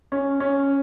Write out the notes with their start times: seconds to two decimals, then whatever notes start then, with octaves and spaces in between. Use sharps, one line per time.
0.12 C#4
0.40 C#4